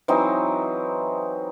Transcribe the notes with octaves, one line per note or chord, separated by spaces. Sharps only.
E3 F#3 C4 D#4